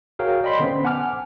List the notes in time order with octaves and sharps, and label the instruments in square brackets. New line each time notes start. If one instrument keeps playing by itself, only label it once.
[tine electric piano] F#4 G#4 A#4 C#5 F5 G5
D5 D#5 G5 B5 C6 B6
D3 B3 C#4 C5
F#5 G#5 A5 D6 F6